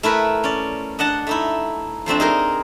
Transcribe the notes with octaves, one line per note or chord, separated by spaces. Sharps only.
A3 E4 A#4 B4
C#4 D5
D4 D#5 F#5 A5
A3 D#4 E4
F3 A3 C4 D4
D#4 G#4 A#4